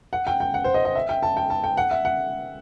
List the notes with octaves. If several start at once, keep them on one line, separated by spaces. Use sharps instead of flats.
F#5
G5
G5
F#5
C5
D#5
D#5
E5
G5
A5
G5
A5
G5
F#5
E5
F#5